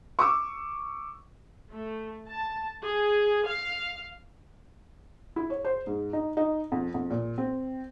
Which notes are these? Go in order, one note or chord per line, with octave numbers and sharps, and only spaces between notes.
C#6 D6 E6
A3
A5
G#4
F5
E4
C#5
C5
G#2
D#4
D#4
F2
F2
A#2
C4